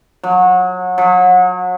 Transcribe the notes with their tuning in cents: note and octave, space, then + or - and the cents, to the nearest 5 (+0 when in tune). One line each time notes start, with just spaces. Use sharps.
F#3 -25
F#3 -30